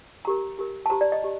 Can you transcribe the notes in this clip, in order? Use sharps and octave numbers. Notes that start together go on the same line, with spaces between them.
D#4 G4 A#4 A#5
D#4 G4 A#4
A5
D#4 G4 C5 A#5
D5
D#5
D#4 G4